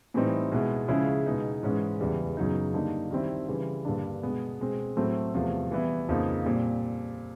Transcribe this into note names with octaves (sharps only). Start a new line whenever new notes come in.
A2 E3 G3 C4 D#4
B2 G#3 B3 E4
C#3 F3 G#3 C#4 E4
B2 G#3 B3 D#4
G#2 E3 G#3 C#4
E2 C#3 E3 G3
F#2 C#3 F#3 B3 D#4
D3 G3 A#3 D#4
D#3 G3 C4 E4
C#3 E3 G3
G2 D3 G3 A#3 D4
B2 G#3 B3
B2 G#3 C4
A2 F#3 A3 C4
E2 C3 F3 A3
E3 G3 B3 E4
F2 C#3 F3 A#3 D#4
A#2 G3 C4